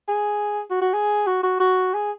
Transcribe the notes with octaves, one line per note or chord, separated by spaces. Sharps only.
G#4
F#4
F#4
G#4
F#4
F#4
F#4
G#4